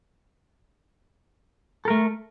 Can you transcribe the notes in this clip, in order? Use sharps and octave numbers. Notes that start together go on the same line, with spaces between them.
A3 A4 A#4